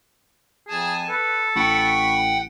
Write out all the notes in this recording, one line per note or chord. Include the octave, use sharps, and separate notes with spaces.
F2 G#4 G#5 A5
A4 B4
A1 F#5 G5 B5 C#6